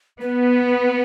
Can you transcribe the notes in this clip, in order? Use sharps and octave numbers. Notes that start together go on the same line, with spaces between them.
B3 B4